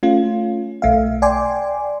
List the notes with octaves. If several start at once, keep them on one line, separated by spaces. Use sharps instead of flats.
A3 C#4 F4
B1 A3 E5 F5
D5 G5 G#5 C6 D6